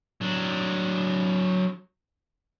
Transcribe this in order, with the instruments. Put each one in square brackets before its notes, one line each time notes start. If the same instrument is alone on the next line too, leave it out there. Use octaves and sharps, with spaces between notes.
[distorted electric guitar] F#3 D4